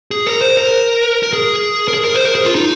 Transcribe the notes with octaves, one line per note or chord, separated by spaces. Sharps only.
G#4
A#4
C5
A#4
A#4
G#4
A#4
G#4
A#4
C5
A#4
G#4
F4
D#4